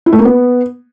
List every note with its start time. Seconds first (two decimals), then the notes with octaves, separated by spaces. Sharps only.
0.06 E4
0.13 A3
0.19 A#3
0.25 B3